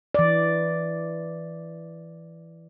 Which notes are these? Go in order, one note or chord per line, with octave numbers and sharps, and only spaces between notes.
E3 D5